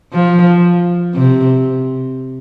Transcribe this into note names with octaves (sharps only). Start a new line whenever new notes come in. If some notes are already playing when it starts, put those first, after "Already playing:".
F3
C3